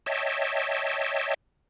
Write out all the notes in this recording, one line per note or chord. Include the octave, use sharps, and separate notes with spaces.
C#5 D#5 E5 G5 A5